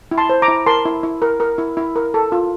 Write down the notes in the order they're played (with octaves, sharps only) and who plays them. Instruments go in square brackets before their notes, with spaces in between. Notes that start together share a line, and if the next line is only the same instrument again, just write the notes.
[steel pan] E4
A5 C6
C5
A#5 D6
E4
A#4 A5 C6
E4
E4
A#4
A#4
E4
E4
A#4
A4
F4